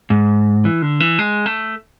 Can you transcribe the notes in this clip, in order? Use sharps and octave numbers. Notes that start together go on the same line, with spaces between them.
G#2
E3
D3
E3
G#3
A3